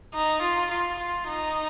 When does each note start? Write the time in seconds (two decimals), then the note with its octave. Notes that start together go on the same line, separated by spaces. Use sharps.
0.14 D#4
0.42 F4
0.70 F4
0.99 F4
1.28 D#4